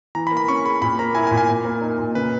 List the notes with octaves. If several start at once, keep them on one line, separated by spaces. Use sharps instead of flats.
E3 A#5
B5
A#3
B5
C#4 C#6
G#4 B5
A#2 B5
A#3 A#5
E4 G#5
G#5
A#2
G#5
A#2
A#3
D#4
A#2
C#3 B4